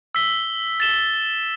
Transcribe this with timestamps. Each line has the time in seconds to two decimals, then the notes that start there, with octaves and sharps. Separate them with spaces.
0.15 E6 B6 G7
0.80 A6 E7 G7